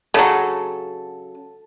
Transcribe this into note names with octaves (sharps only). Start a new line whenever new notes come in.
C#3 F#3 A4